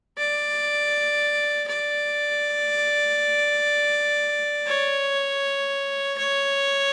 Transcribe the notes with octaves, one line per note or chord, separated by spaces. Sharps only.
D5
D5
C#5
C#5